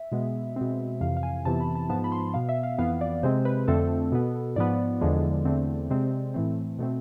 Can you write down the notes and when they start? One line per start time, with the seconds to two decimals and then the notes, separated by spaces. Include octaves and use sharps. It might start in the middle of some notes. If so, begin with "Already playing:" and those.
Already playing: E5
0.12 B2 G#3 B3
0.56 B2 G#3 C4
1.01 F2 C3 E3 F5
1.17 F5
1.23 G#5
1.45 F2 C3 E3 B3 A5
1.60 B5
1.75 A5
1.89 G#2 F3 B3 A5
2.04 B5
2.12 C6
2.34 B2 B3 F5
2.49 E5
2.63 F5
2.78 F2 E3 B3 F5
3.01 D5
3.23 C3 G#3 C4 C5
3.45 B4
3.68 F2 D3 A3 C4 A4
4.12 B2 B3
4.56 G#2 F3 B3 D5
5.01 E2 D3 F3 G#3
5.45 E2 D3 A3 C4
5.90 C3 G#3 C4
6.34 A2 E3 A3 C4
6.79 B2 A3 C4